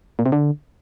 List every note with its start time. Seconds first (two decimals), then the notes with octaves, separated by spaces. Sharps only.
0.19 A#2
0.26 C3
0.32 D3